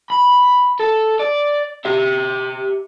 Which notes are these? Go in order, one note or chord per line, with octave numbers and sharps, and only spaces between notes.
B5
A4
D5
G4 E5